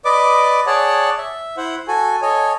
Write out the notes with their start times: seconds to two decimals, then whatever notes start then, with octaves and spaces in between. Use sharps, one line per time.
0.05 B4 D5 D#5 D6
0.67 G#4 C#5 D5 F#5 A5
1.18 E5
1.57 E4 C5 F#5
1.88 F#4 A4 G#5
2.22 A4 C#5 D#5 G#5